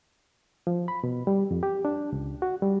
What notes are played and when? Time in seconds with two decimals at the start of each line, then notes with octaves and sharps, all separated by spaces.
0.67 F3
0.88 B5
1.04 B2
1.27 G3
1.51 F2
1.63 G4
1.85 D4
2.12 C#2
2.42 F#4
2.62 G3